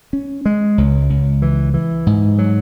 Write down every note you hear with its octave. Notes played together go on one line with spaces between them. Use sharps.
C#4
G#3
C#2
C#2
E3
E3
G#2
F#3